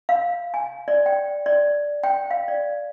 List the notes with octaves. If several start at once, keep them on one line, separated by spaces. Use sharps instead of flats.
F5
G#5
D5
G5
D5
G5
F5
D5